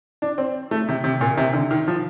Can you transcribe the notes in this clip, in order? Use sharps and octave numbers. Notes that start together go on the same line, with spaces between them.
D4
C4
A3
C3
C3
A#2
C3
D3
D#3
F3